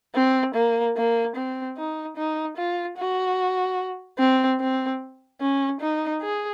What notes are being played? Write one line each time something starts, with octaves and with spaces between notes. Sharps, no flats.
C4
A#3
A#3
C4
D#4
D#4
F4
F#4
C4
C4
C#4
D#4
G#4